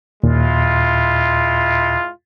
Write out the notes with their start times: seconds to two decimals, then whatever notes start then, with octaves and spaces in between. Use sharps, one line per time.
0.24 D#2 A#2 G#3 E4 F4